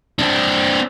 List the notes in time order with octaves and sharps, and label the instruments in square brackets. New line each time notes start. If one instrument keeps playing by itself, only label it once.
[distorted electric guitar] C4 D4